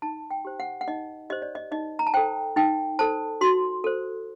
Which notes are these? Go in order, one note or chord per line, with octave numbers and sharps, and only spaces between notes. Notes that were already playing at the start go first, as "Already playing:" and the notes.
D#4 A5
G5
G4 C5
F#5
F#5
D#4 D#5
G4 C5 D#5
D5
D#5
D#4 D#5
A#5
A5
A4 C5 G5
D#4 G5
A4 C5 A5
F#4 C6
A4 C5